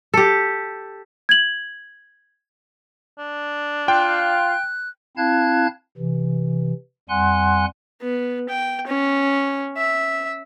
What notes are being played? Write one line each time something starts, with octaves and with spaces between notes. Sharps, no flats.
G4 A4
G#6 F#7
D4
F4 G5 F#6
C4 E4 F5 A5 F#6 G#6
C3 E3
F2 G3 F#5 G#5 C6 F#6
B3
G5
C#4
E5